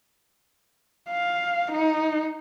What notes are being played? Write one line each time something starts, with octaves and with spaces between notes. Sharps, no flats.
F5
D#4